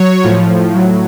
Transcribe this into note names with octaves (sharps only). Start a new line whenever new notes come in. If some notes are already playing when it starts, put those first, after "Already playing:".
Already playing: F#3 C#5
A2 F3
A2 F#3